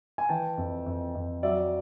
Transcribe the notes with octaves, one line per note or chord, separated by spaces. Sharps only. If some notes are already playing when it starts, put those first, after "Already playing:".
G#5
E3 G5 A5
F2
F2
F2
F#3 D5 E5